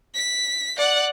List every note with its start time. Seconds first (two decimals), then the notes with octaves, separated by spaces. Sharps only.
0.15 B6
0.78 D5 F#5